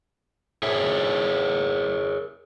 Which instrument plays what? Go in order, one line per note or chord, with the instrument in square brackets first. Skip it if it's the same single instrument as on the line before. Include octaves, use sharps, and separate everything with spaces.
[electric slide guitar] G#4 A#4 C#5 E5